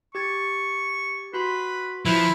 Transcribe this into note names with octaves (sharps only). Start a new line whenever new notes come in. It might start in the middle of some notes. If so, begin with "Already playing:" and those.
G4 C#6 G#6 A6
F#4 B4 B5 C6
F3 E4 B4